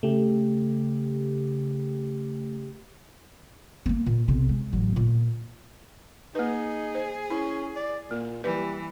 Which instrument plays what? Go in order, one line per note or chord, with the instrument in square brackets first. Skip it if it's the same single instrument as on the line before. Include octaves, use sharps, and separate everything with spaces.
[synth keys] C#3 G4 [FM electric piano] A3
[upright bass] A#3 C#4
A#2
B1 C3
G#3
A1 F#3
A#2
[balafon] A#3 B4 [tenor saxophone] D#4 [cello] G#4
[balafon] C5
[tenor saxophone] C#4 [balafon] E4
[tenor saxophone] D5
[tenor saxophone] A#2 [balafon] A#3
[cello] E3 [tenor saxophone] G3 [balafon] B4